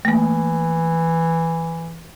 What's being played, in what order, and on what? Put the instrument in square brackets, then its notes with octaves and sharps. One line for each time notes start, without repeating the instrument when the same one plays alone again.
[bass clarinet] E3 [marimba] A3 A#3